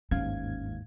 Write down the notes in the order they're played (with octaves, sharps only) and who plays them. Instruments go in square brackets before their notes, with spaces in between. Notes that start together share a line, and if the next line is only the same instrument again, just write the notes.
[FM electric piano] G1 F5 G#6 [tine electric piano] D#2 G#2 [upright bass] C#4